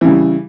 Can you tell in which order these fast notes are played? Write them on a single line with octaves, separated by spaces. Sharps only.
E3 C#3 G3